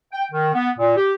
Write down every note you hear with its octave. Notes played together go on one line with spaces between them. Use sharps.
G5
D#3
B3
A#2
G4